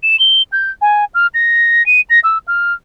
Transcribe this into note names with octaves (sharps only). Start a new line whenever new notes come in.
E7
G7
G6
G#5
F6
A#6
D#7
A#6
E6
F6